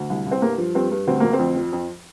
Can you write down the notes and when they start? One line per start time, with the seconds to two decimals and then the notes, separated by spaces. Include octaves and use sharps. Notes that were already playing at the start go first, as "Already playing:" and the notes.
Already playing: D2
0.10 C2
0.26 C2
0.31 C4
0.42 G2 A#3
0.58 F3
0.75 G2 C4
0.92 G2
1.07 D2 C4
1.20 D2 A#3
1.33 C4
1.39 F2
1.56 F3
1.73 F2